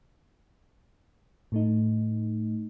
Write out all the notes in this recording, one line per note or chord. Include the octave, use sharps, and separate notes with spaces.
A2 A3 D#4